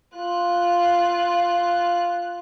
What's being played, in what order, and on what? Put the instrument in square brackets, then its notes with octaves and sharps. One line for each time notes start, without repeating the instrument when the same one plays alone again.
[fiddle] F4 F#6